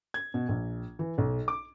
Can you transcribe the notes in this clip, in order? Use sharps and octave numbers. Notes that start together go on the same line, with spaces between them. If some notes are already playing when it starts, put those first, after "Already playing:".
G#6
B2
A#1
E3
B1
D6